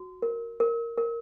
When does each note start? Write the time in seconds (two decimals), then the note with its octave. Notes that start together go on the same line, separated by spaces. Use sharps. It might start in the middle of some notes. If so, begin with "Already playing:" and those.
Already playing: F#4
0.22 A#4
0.60 A#4
0.97 A#4